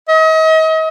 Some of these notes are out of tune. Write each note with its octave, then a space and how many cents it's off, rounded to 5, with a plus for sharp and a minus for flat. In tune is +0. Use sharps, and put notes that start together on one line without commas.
D#5 +40